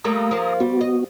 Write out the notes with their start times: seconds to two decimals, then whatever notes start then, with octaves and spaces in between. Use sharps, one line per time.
0.04 G3 A3 A#3 A#5 D#6
0.31 F3 A#3
0.60 G3 B3 F#4
0.81 D#5